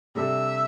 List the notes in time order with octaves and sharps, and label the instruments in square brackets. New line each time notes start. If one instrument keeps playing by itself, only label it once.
[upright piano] C3 G3 D4 A4 [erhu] E5